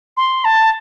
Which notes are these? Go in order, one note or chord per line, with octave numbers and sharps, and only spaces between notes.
C6
A5